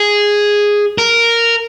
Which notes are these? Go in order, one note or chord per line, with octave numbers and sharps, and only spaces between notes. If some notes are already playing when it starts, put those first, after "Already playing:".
Already playing: G#4
A#4